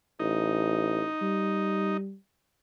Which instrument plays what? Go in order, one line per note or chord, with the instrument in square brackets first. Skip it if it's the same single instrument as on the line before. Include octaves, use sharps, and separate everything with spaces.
[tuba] A1 [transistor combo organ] D#4
[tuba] G3